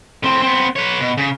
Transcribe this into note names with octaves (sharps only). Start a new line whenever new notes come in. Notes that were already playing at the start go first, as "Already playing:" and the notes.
A2 C4
B3 C4
B4 C#5
B2
C#3